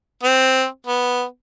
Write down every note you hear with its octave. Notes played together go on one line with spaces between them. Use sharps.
C4
B3